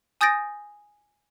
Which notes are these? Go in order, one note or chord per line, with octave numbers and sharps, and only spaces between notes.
G#5 D#6 G6 A6 A#6 D7